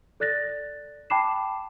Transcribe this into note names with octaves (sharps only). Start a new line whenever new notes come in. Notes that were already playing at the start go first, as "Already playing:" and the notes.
A4 D5 F#6 A6 A#6
G5 A5 B5 D6 C7 E7